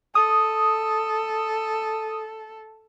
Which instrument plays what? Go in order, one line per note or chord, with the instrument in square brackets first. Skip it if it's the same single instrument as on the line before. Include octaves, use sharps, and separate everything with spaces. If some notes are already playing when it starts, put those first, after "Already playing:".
[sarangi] A4 [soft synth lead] D#6